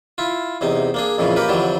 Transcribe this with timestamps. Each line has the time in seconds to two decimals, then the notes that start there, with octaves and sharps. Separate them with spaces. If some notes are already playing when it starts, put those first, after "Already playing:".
0.18 E4 F4
0.61 E2 C3 D#4
0.94 A#3 D4 G#4
1.18 F2 A#2 C#3 E3
1.36 A#3 G4 A#4 B4
1.48 F2 D3 E3 F#3 G3